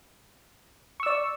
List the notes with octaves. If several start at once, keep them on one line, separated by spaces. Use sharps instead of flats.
D5 C#6 E6